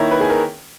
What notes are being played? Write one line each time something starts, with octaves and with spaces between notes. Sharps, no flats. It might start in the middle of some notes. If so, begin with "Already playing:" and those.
Already playing: D#3 A#3 E4 C#5
B4
G#4
A#4